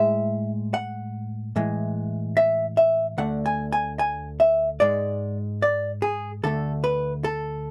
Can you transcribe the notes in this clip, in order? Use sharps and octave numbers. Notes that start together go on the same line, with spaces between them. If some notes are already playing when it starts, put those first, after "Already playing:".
Already playing: A2 G#3 E5
F#5
A2 E3 G#3
E5
E5
D2 D3 A3 F#5
G#5
G#5
G#5
E5
G#2 G#3 D5
D5
G#4
D2 D3 A3 A4
B4
A4